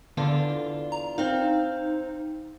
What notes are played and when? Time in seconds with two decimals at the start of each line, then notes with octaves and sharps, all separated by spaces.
0.17 E2 D3 D4 F4
0.92 A#5
1.18 C4 D#4 F5